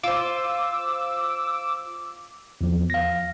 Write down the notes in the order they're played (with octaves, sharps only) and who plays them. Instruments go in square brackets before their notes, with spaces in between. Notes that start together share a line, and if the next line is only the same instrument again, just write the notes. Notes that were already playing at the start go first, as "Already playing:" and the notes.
[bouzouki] F4 C5 [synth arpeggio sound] D6 E6
[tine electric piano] E2 F3
F5 A#6